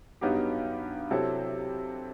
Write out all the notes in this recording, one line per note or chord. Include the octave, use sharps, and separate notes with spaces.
G2 F#3 B3 D#4 G4
C3 F#3 C4 E4 A4